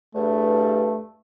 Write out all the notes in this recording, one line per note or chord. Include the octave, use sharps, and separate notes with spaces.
E2 G2 A3